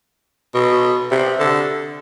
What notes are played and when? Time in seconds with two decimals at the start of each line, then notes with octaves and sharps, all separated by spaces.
0.55 B2
1.11 C3
1.40 D3